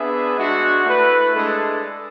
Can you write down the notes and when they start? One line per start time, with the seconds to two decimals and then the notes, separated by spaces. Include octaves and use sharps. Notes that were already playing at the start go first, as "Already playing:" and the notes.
Already playing: B3 D4 G#4 B4 E5
0.35 G#3 D4 F#4
0.85 A3 E4 B4
1.34 G#3 D4 A4